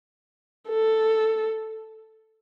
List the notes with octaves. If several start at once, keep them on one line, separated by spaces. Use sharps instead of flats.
A4